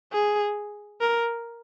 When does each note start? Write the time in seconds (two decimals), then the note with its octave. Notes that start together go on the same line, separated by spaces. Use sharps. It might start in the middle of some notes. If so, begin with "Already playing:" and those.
0.13 G#4
1.01 A#4